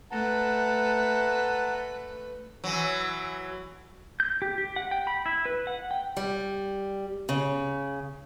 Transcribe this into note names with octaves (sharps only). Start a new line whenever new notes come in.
A3 B4 F#5 A5 A#5
E3 F#3
G6
G4
G4
F#5
G5
B5
E4
B4
F#5
G5
G3
C#3